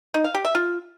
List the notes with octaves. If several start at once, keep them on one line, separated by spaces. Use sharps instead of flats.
D#4
F5
G4
E5
F4